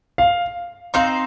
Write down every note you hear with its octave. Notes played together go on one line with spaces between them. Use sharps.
F5
C4 D#4 C5 F5